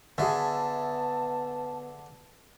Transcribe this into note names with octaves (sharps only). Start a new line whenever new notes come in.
D3 B3 G#4 E5 A5